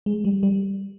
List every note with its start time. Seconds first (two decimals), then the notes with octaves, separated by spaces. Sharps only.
0.06 G#3
0.25 G3
0.43 G3